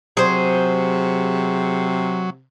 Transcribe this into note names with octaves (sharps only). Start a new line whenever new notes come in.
C3 F#3 G#4 C5